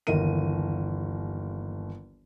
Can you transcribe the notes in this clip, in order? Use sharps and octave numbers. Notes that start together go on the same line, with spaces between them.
G1 D#2 E3 A#4 D#7